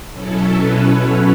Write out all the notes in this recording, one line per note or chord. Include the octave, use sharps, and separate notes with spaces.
B2 F#3 C#4 E4 A4
B4
C#5